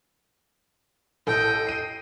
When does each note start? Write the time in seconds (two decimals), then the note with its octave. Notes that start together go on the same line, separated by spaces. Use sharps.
1.27 A1 A4 D#5 G5
1.67 C7 D#7